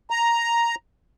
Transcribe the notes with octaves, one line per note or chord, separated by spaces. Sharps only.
A#5